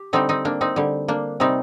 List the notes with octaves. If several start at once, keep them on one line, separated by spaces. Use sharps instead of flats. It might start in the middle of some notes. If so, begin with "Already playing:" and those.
Already playing: G4
D3 G3 C4 D#4
C4 D#4
A#3 D4
C4 D#4
D3 G3
A#3 D4
C3 G3 C4 D#4